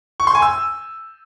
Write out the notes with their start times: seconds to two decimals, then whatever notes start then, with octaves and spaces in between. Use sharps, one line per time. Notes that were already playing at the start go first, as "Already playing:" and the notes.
0.20 C#6
0.27 C6
0.35 G#5
0.42 E6